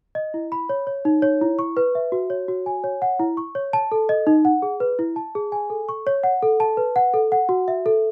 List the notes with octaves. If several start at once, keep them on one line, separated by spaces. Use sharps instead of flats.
D#5
E4
B5
C#5
C#5
D#4
C#5
E4
C#6
B4
E5
F#4
C#5
F#4
G#5
C#5
F#5
E4
C#6
C#5
A5
A4
D#5
D#4
F#5
G#4
B4
E4
A5
G#4
G#5
A4
C#6
C#5
F#5
A4
A5
B4
F#5
A4
F#5
F#4
E5
A4